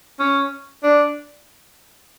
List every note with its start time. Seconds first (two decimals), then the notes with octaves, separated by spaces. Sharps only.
0.20 C#4
0.83 D4